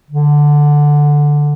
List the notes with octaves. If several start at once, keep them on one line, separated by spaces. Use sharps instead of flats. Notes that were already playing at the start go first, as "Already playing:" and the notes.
D3